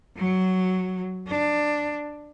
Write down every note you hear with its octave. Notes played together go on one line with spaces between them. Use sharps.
F#3
D4